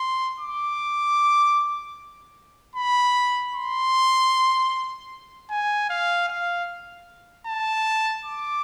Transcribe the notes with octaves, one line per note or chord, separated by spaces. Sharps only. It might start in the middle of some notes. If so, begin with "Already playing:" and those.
Already playing: C6
D6
B5
C6
G#5
F5
F5
A5
D6